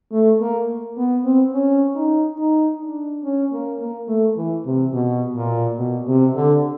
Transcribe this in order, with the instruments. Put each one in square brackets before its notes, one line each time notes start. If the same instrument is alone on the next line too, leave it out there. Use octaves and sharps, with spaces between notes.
[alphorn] A3
A#3
B3
C4
C#4
D#4
D#4
D4
C#4
A#3
A#3
A3
E3
C3
B2
A#2
B2
C3
D3